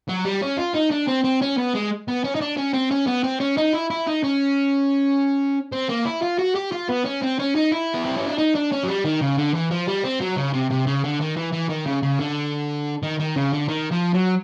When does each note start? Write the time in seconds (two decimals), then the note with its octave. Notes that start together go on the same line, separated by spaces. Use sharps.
0.09 F#3
0.25 G3
0.42 C#4
0.58 F4
0.75 D#4
0.91 D4
1.08 C4
1.24 C4
1.42 C#4
1.57 B3
1.74 G#3
2.08 B3
2.24 C#4
2.35 D#4
2.41 D4
2.57 C#4
2.73 C4
2.91 C#4
3.07 B3
3.24 C4
3.40 C#4
3.57 D#4
3.73 E4
3.90 E4
4.07 D#4
4.23 C#4
5.72 C4
5.89 A#3
6.05 E4
6.23 F4
6.39 F#4
6.55 G4
6.72 F4
6.88 B3
7.05 C#4
7.22 C4
7.39 C#4
7.55 D#4
7.72 E4
7.94 B3
8.05 C4
8.17 C#4
8.27 D4
8.38 D#4
8.55 D4
8.72 C#4
8.84 F#3
8.88 G3
9.05 D#3
9.21 C#3
9.37 D3
9.54 E3
9.71 F3
9.87 G3
10.04 C4
10.21 F#3
10.37 C#3
10.54 C3
10.71 C3
10.87 C#3
11.04 D3
11.21 D#3
11.37 E3
11.53 E3
11.70 D#3
11.86 C#3
12.03 C#3
12.19 D3
13.03 D#3
13.19 D#3
13.36 C#3
13.52 D3
13.68 D#3
13.91 F3
14.14 F#3